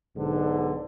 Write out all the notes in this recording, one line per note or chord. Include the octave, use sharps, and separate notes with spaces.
B1 G#2 D3